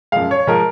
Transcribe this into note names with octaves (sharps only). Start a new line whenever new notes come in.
F#2 F3 G#3 F5
C#5
F3 G#3 A#4